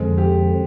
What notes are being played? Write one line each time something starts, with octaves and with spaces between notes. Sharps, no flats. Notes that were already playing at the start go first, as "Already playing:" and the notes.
Already playing: F2 D3 F3 G#3
G4